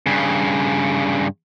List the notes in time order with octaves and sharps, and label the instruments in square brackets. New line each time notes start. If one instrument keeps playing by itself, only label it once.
[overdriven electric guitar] G2 C#3